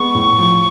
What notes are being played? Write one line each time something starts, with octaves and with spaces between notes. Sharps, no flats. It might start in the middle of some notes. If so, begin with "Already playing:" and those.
Already playing: G#3 B3 C#6
A2
F3